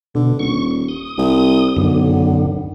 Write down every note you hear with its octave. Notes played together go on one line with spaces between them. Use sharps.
B2 D3
D#1 C#6
D#6
C2
B1 F#2 D3